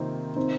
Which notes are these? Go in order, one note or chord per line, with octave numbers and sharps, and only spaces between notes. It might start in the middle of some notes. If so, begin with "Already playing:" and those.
Already playing: C3 D#3 A#3 C4 D#4 F4
C4 D#4